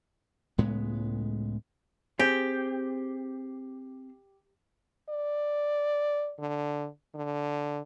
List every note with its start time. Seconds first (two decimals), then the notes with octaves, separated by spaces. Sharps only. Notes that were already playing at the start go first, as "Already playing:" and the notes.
0.58 C#2 A2 G#3 B3
2.19 C4 G4 G#4
5.09 D5
6.39 D3
7.14 D3